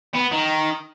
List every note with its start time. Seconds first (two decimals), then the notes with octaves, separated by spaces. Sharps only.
0.14 B3
0.32 D#3